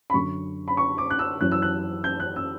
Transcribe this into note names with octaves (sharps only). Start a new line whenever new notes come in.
B5
F#2 D3 C#6
B5
C#6
D6
F#6
E6
F#2 E3 F#6
E6
F#6
G6
F#6
E6